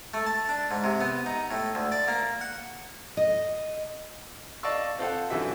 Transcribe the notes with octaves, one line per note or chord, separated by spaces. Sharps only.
A3
A5
D4
G#2
C3
B3
D#4
A2
D2
D5
A#3
F#5
D#5
D5 D#5 F5 A5 C#6 E6
C4 F4 A4 C5 F5 F#5
F#2 D3 E3 F#3 E5